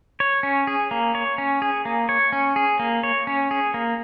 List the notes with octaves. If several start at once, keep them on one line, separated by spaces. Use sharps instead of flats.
C#5
C#4
G#4
A#3
C#5
C#4
G#4
A#3
C#5
C#4
G#4
A#3
C#5
C#4
G#4
A#3